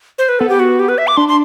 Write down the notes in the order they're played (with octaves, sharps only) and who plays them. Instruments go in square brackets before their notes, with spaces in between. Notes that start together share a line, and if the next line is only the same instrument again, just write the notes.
[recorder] C5
B4
[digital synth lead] B3 [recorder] A4
[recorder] G4
F#4
G4
B4
E5
D6
[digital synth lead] D4 [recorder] C6
[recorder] C6